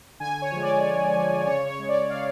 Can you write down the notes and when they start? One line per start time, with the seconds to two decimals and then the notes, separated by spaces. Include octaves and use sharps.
0.20 D3 G#5
0.42 C#5
0.51 F3 G#3
0.62 D5
0.84 D3
1.15 F3 G#3
1.46 C#3 C#5
1.68 C#5
1.79 G#3
1.89 D5
2.10 C#3 F5